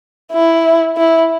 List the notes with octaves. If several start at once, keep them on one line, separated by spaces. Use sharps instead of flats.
E4
E4